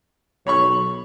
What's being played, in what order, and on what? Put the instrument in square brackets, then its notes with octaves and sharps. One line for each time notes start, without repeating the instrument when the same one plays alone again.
[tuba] B1 [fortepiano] C#5 B5 C#6